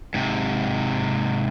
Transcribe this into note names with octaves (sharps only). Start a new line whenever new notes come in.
G#2 C3